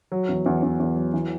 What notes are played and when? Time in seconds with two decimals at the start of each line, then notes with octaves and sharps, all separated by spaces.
0.12 F#3
0.29 E2
0.46 E2
0.63 E2
0.80 E2
0.96 F#3
1.14 E3